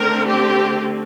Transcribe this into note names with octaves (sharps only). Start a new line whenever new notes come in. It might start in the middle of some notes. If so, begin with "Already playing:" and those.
Already playing: D3 A3 C4 A#4
G4